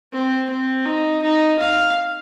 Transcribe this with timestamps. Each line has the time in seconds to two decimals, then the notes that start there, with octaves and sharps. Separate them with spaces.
0.12 C4
0.49 C4
0.85 D#4
1.22 D#4
1.59 F5